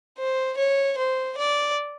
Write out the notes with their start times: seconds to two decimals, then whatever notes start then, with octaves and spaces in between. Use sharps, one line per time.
0.18 C5
0.57 C#5
0.97 C5
1.37 D5